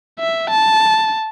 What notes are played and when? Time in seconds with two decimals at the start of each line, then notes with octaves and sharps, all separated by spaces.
0.20 E5
0.50 A5